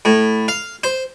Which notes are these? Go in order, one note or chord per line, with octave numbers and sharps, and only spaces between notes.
A2
F5
C5